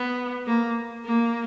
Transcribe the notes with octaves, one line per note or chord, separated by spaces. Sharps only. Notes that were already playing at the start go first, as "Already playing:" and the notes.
Already playing: B3
A#3
A#3